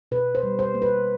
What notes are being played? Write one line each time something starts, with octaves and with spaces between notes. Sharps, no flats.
B2 B4
C5
G3
C5
A#3
B4